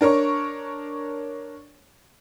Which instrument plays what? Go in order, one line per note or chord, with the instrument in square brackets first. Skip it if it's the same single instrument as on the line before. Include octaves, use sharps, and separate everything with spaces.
[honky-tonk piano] D4 A#4 C#5 C#6